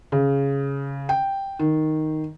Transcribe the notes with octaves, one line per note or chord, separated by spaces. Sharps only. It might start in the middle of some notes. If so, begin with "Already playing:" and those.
C#3
G5
D#3